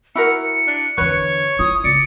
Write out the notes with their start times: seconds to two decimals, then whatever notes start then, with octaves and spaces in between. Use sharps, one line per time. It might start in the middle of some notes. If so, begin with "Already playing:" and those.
0.15 E4 F#4 A#4 C#7
0.67 D4
0.98 E2 D3 B4 C#5
1.59 E4 F4 D#6
1.84 C2 C#3 D5 C#7